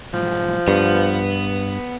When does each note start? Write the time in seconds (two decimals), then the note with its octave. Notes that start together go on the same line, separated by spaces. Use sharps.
0.13 B1 G#2 F3
0.68 G2 B3